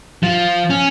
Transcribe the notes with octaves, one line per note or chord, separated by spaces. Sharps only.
F3
C#4